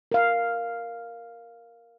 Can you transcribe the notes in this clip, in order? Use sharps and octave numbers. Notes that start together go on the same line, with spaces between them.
A#4 F5